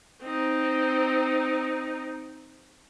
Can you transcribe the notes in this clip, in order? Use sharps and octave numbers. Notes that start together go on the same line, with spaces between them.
C4 D#4